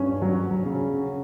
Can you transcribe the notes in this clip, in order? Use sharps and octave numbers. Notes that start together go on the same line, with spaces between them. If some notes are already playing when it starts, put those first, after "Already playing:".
Already playing: G2 C#4
F#3 F#4
F#3
C#3